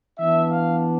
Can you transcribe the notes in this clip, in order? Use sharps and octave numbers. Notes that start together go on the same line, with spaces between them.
E3 B3 D4 E5
F5